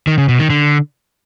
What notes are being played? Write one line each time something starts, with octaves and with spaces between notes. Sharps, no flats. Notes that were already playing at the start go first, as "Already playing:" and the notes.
D#3
C#3
B2
D#3
D3